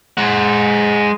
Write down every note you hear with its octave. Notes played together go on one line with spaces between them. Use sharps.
G#3 F#5